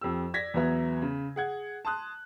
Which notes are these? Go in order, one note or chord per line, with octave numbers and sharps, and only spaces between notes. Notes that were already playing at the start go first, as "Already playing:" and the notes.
F2 G4 E6
D5 G#6 A#6 B6
E2 F#3 B3 B4 E5 A#5
C#3
G#4 F#5 G#6
A5 C6 D#6 F#6